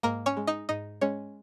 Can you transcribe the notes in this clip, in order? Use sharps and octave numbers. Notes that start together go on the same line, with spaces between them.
G#2 A#3 A#4
C#4 C#5
G#3
D#4 D#5
G#2 D#4 D#5
G#3 C#4 C#5